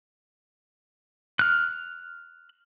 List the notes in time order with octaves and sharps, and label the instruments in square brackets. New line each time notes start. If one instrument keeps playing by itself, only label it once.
[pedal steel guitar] F6 F#6